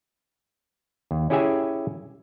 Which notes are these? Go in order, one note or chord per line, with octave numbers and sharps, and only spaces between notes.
D#2
C#4 E4 G4 G#4 E5 G#5